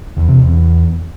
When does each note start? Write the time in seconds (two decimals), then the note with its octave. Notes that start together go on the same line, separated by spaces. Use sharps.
0.17 E2
0.28 C3
0.39 E2